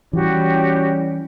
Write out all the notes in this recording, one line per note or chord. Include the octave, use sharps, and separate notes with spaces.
E3 G3 C#4 F#4 G4